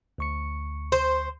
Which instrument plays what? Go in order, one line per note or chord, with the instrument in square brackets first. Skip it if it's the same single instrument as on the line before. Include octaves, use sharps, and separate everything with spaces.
[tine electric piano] D2 C#6 C#7
[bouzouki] C5